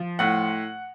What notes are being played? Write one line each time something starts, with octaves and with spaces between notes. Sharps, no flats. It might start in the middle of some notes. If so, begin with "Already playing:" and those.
Already playing: F3
A2 F#5